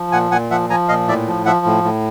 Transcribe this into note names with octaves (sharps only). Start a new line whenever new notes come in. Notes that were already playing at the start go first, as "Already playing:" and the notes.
Already playing: F3
A#2 F#5 G#5
A#2 F#5 G#5
F3 E5 F#5
F3 G#5 A#5
A#2 D#5 F5
A2 D5 E5
F3
F3 E5 F#5
A2
A2